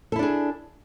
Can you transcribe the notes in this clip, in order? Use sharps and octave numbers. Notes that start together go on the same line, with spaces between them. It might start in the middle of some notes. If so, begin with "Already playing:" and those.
D4 E4 G#4 A4